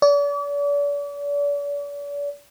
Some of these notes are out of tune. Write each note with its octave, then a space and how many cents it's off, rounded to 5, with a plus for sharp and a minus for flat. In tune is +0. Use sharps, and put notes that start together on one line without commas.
D5 -40